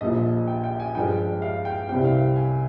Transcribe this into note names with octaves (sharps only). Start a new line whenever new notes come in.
A#1 A#2 F3 D#5
G5
G5
G#5
G2 F3 G#3 G5
F5
G5
C2 C3 G3 C4 G5
F5
G#5